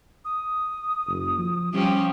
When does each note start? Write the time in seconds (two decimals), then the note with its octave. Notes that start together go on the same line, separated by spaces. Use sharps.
0.25 D#6
1.07 F#1
1.38 F3
1.73 F3 G3 C#4 G4